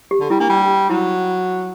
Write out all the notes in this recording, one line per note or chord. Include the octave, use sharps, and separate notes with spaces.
G4
D3
G3 E4
A#3 D4
G3
F#3 E4